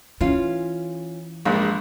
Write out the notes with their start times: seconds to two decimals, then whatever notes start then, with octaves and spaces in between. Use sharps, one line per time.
0.21 E3 C#4 F4
1.45 A#1 G2 G#3